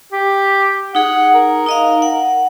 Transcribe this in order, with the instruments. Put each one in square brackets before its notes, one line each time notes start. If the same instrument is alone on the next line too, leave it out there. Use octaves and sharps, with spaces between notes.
[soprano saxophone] G4
[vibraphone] D#4 G#4 [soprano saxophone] F#5
[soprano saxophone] A#4
[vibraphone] D#4 D#5 F5
F#5